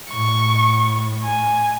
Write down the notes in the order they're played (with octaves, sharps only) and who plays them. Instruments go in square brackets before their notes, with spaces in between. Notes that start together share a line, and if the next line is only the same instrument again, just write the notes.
[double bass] A2 [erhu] C#6
[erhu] G#5